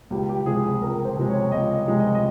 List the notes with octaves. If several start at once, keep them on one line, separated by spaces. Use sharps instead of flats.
C#2 G4
G4
C3 F3 G#3 G#4
G#4
C#2 A#4
C5
C3 F3 G#3
C#5
C#2 D#5
D#5
C3 F3 G#3
D#5
D#5